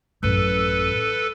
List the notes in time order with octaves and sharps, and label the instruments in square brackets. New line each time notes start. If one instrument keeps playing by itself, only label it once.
[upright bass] A1 F#2 [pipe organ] A4 B4